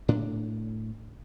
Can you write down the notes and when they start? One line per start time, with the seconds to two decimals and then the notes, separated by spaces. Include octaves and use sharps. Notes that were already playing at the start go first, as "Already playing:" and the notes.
0.08 A2 D4